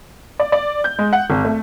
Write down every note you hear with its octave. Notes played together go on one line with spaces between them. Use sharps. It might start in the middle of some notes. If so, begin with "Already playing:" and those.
D5
D5
G6
G#3
F#5
G#1
A3